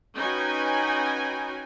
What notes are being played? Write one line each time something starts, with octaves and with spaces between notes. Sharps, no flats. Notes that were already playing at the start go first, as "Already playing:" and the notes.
C#4 D#4 F#4 B4 G5 G#5